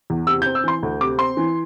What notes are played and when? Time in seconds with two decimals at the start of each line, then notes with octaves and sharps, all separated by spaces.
0.10 E2
0.27 C3 E6
0.42 G6
0.46 C4
0.55 E6
0.64 E3 C6
0.83 D2
1.01 C3 D6
1.18 C4 C6
1.37 E3